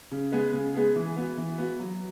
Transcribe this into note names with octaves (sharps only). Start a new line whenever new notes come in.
C#3
G#3 B3 G#4
C#3
G#3 B3 G#4
E3
B3 F#4
E3
B3 F#4
F#3